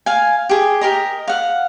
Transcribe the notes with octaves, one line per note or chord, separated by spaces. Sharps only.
F5 G#5
G4 G#4
G4 A#4 D#5
F5 F#5